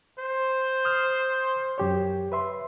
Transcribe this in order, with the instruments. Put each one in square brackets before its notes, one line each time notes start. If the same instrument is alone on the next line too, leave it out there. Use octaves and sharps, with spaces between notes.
[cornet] C5
[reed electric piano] D#6 F6
F#2 G4 C#5
B4 E5 C6